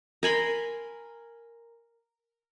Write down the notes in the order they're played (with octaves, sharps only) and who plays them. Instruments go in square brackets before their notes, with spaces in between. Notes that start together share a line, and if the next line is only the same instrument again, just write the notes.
[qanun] A#4 G#5 B5 C6